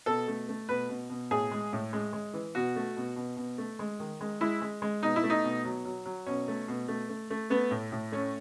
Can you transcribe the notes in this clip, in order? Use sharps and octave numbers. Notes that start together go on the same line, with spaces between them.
B2 A4
A3
A3
B2 B4
B2
B2
A2 G#4
G#3
A2
G#3
G#3
E3
B2 F#4
A3
B2
B2
B2
A3
G#3
D#3
G#3
G#3 E4
G#3
G#3
B2 D#4
E4
A3
D#4
B2
F#3
F#3
F#3
B2 C#4
A3
B2
A3
A3
A3
A3 B3
A2
A2
A3 C#4